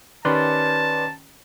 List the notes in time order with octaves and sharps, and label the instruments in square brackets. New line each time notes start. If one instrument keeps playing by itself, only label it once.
[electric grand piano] D#3 C#4 G4 [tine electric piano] B4 D5 C6 [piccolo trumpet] A5